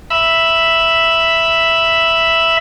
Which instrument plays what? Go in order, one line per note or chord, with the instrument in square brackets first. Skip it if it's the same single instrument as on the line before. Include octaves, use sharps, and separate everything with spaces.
[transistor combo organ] E5 B5